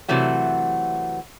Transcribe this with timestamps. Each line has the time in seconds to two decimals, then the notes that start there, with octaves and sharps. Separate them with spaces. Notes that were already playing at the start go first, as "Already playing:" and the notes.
0.08 C3 E3 F#3 A3 F#4